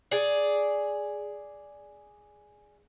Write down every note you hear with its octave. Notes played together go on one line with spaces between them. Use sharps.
G#4 D5